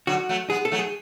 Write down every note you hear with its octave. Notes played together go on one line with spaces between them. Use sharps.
D3 F#3 F#4
F#3 A3
G#3 B3 G#4
A4
F#3 A3
G#4